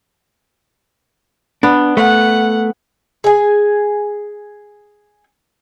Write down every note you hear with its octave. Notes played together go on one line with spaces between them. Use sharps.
B3 D4
A3 F#5
G#4 G#5